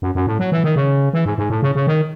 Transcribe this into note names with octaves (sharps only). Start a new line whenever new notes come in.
F#2
F#2
A2
F#3
E3
D#3
C#3
E3
G#2
G#2
A2
C#3
C#3
D#3